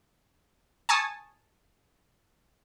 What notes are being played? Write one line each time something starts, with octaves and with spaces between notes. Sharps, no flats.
G#5 A5 C#6 D#6